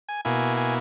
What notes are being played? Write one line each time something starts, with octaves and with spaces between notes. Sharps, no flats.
G#5
B2 A#3 E4 G#5
G#5